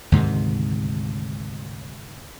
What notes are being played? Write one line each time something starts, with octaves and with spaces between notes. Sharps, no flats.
D2 G#2 C3 D#3